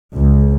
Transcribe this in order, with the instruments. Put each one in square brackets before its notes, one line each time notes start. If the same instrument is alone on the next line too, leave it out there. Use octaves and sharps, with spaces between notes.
[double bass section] C#2